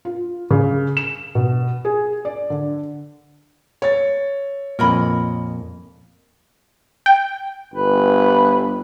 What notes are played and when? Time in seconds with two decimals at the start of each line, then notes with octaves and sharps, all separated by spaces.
0.05 F4
0.51 C#3
0.97 E7
1.35 B2
1.85 G#4
2.25 D5
2.50 D3
3.82 C#5 A6
4.79 F2 A#2 A#4 D#5 B5
7.06 G5
7.74 G1 B4